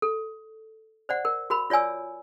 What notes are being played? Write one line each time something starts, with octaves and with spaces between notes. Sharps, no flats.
A4
C5 D5 F#5
A#4
F#4 A#4 B5
F4 C#5 D5 G#5 E6